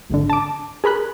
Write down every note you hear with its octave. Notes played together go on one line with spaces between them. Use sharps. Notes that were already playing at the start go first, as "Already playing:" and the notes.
A1 G#2 D3
A5 D6
G#4 A#4 B5 F#6